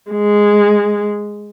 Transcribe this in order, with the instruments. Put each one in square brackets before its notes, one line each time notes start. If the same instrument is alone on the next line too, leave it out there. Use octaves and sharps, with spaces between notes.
[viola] G#3